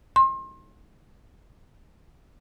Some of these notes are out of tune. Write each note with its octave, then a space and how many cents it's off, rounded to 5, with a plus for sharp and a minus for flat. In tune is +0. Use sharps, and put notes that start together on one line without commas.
C6 +35